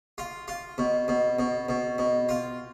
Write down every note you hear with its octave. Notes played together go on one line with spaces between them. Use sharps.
F4
F4
B2
B2
B2
B2
B2
F4